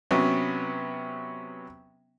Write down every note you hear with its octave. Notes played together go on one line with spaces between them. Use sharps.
C3 F#3 B3 C#4